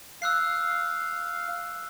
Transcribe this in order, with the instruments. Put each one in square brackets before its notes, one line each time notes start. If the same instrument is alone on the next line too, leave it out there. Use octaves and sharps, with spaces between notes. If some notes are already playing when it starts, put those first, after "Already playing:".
[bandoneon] F5 [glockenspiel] E6 F#6 C7